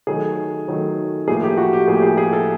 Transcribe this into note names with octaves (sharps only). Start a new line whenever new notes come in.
D#3 F#3 A3 G#4
D#3 F#3 A3
A2 F3 A#3 G#4
G4
F#4
G4
A2 F3 A#3 G#4
G4
G#4
G#4
A4